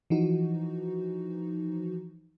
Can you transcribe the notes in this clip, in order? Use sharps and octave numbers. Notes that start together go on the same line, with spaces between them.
E3 F3 D#4 F#4